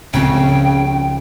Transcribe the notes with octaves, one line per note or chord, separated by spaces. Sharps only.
C#2 C#3 F3 C4 G5